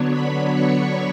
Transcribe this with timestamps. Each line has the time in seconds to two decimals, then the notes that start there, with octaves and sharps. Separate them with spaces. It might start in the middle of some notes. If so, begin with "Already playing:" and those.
Already playing: D3 F#3 B3 D4 C#5
0.11 B5
0.55 C#6